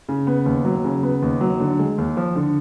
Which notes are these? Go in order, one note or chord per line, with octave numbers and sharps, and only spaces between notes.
C#3
B3
D#2
F#3
C#3
B3
D#2
F#3
D3
G#3
D#2
F3
D3